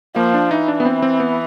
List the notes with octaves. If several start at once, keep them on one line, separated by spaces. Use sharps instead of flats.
F3 A#3
D4
E3 D#4
D4
B3
C4
C4
B3